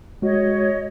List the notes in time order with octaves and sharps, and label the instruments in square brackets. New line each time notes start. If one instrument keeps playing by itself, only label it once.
[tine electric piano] G#3 F#4 [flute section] C#5 D#5